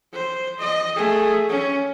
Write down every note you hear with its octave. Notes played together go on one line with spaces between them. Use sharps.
C5
D#5
A3 G#4
C#4